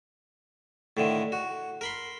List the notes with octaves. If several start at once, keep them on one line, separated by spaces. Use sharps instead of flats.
A2 D3 D#3
F#4
A#4 B5 C6